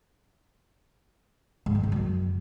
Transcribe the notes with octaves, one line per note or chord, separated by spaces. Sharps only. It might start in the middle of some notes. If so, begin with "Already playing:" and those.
G#2
D#3
C#3
F#2